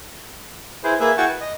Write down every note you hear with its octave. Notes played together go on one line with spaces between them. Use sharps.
E4 G#4 B4 C5
A#3 G#4 B4 E5
E4 F#4 G#4 G5 A5 C#6
B4
D#5